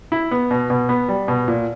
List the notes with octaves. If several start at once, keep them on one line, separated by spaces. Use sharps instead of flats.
E4
B3
B2
B2
B3
G3
B2
A#2